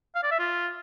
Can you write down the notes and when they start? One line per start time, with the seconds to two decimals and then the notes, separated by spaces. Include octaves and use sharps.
0.15 F5
0.23 D5
0.31 E5
0.39 F4